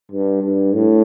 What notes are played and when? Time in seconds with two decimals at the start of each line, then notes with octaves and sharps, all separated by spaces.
0.11 G2
0.42 G2
0.73 A2